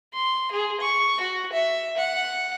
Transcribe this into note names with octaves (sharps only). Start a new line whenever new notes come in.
C6
G#4
C#6
F#4
E5
F#5